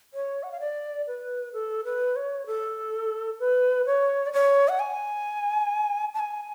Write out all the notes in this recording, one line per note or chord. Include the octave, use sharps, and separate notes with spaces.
C#5
F#5
F5
D5
B4
A4
B4
C#5
A4
B4
C#5
D5
C#5
F#5
G#5
A5
G#5